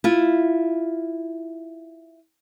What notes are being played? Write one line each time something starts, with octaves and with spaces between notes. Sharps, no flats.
E4 F4